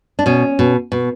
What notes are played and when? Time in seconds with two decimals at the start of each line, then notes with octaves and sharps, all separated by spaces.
0.19 D4
0.26 B2 C#4
0.59 B2
0.92 B2